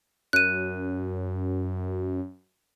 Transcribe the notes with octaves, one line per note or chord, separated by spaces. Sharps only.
F#2 F#6 D#7